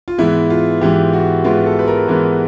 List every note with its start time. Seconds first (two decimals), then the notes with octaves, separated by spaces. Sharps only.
0.08 F4
0.18 G#2 E3 G#3 B3 E4
0.50 F4
0.81 G#2 E3 G#3 B3 G4
1.13 F#4
1.44 G#2 E3 G#3 B3 F4
1.66 A4
1.79 B4
1.88 A#4
2.08 G#2 E3 G#3 B3 A#4